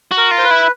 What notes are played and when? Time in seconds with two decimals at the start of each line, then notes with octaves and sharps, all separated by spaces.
0.11 F#4
0.18 A#4
0.31 F4
0.38 C5
0.44 B4
0.51 E4